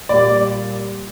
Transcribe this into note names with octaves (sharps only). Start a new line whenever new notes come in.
A#2 G3 D5